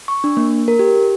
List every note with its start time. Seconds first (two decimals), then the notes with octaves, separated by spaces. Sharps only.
0.08 C#6
0.24 D4
0.37 A#3
0.68 A#4
0.79 G4